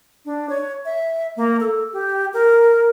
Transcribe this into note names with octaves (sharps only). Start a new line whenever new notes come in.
D4
C#5
E5
A#3
A4
G4
A#4